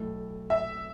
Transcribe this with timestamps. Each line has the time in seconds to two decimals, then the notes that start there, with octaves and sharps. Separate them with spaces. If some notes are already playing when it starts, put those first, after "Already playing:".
Already playing: B1 A2 A3 E4 A4
0.50 E5